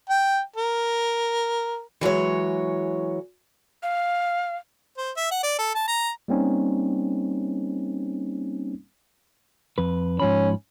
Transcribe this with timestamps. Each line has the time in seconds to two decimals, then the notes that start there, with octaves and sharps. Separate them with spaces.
0.10 G5
0.56 A#4
2.01 E3 F#3 G#3 C#5
3.83 F5
4.98 C5
5.17 E5
5.31 F#5
5.43 D5
5.59 A4
5.75 A5
5.87 A#5
6.28 G3 A#3 C4 C#4 D#4
9.78 F2 B4
10.20 G#2 F3 C#4 B5